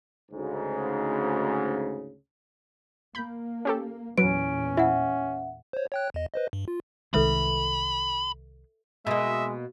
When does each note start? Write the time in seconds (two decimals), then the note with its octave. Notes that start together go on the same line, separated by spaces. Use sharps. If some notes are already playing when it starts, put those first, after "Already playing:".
0.32 D2 G#2 C#3
3.15 A#3 B5 G6
3.65 C#4 G4 A4
4.18 E2 A#2 F#3 C#4 B4 D7
4.77 E4 E5 F#5
5.73 C5 C#5
5.92 C#5 G5 F#6
6.14 E2 D#5
6.34 B4 C5 D#5
6.53 G2
6.68 F4
7.14 C2 D#3 G#3 A4 B4 E5 B5
9.07 B2 G#3 A#3 D#5 E5